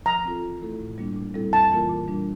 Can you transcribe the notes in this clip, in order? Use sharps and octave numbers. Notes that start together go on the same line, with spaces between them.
F3 A#5
C4 F4 A4
E3
A3 E4 A4
A2
G3 A#3 D4
A#2
G3 C4 E4 A4
F2 A5
E3 A#3 F4 A#4
A#2
G3 D4